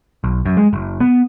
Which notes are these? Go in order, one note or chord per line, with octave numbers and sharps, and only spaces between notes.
B1
F#2
G#3
F#1
B3